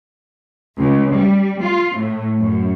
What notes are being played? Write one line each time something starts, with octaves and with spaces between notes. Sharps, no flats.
C#2
G3
F4
A2
F#2